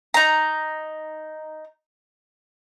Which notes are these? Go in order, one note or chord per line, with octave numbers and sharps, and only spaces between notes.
D#4 A#5